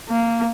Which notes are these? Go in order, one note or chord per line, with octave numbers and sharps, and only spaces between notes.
A#3